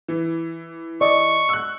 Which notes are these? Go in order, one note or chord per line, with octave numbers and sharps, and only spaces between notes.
E3
D5 D#5 C#6
E6 F#6